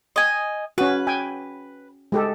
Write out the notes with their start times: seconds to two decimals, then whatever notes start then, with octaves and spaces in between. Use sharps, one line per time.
0.16 D#5 G#5
0.78 C#4 F#4 B4
1.07 G5 G#5
2.12 G#3 G4 A4